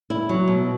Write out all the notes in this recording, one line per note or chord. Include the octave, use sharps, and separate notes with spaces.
E4
F#3
B2